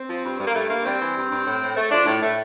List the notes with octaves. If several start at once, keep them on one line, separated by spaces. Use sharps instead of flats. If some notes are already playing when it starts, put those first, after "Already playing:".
Already playing: C4
F3
G2
G2
A#3
G2 A3
G2 A#3
G3 C4
E3
G2
G2
A2
A2
A3
F3 D4
A2
A2 A3